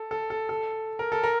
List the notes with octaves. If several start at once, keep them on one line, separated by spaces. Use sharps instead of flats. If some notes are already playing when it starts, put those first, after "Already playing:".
Already playing: A4
A4
A4
A4
A#4
A4
A#4